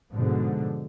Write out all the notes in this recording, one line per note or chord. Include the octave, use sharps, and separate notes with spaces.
G#2 B2 D3 F3